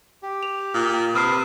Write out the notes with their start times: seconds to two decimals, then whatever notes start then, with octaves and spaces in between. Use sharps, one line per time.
0.23 G4
0.43 F7
0.74 A#2
1.14 C3 B4 D#6 F6 C7